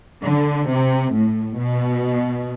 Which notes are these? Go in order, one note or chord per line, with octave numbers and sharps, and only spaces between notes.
D3
C3
A2
B2